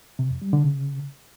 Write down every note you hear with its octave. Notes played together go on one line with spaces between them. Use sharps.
C3
F2
G3
D3
C#3